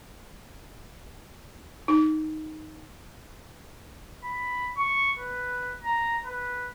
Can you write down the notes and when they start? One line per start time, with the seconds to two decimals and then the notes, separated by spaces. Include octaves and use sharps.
1.88 D#4
4.24 B5
4.77 C#6
5.18 B4
5.82 A#5
6.25 B4